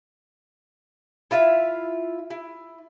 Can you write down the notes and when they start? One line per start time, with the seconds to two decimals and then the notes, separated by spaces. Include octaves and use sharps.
1.31 E4 F4 E5 F5
2.30 E4